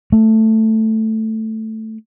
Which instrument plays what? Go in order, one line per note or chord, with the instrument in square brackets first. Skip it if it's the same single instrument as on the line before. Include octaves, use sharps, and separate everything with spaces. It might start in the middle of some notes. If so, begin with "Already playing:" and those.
[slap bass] A3